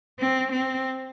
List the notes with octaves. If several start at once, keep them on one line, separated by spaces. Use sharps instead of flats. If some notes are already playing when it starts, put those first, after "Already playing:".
C4
C4